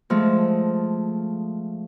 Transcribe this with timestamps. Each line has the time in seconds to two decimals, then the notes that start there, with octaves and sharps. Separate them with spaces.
0.10 F3 G#3 A3